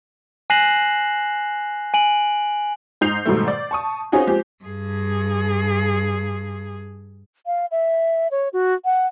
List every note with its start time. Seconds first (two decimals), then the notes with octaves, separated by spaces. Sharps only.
0.50 G#5 F#6 A#6 C7 E7 F#7
1.94 G#5 D7 F#7
3.01 G#2 D#4 G6 C7 F7
3.26 G#2 B2 D#3 G3 A3
3.48 D5
3.71 A5 C#6 D#6
4.12 C4 C#4 D#4 F4 F#4 G#4
4.27 F3 G#3 C4 G4
4.65 G2 G#4
7.46 F5
7.71 E5
8.31 C#5
8.53 F#4
8.85 F#5